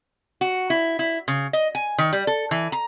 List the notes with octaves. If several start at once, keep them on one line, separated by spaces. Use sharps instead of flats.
F#4
E4
E4
C#3
D#5
G#5
D#3
G3
A4
E3
A#5